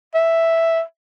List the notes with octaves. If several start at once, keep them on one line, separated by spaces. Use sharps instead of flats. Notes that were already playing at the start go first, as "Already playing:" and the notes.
E5